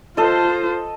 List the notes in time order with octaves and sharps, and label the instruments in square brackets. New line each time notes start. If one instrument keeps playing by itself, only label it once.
[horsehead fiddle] F4 C5 [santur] A4 D#5